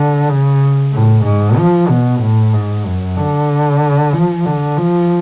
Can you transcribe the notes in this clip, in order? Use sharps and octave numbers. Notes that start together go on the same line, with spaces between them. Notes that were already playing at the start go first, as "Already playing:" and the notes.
Already playing: D3
C#3
A2
G#2
F3
B2
A2
G#2
F#2
D3
F3
D3
F3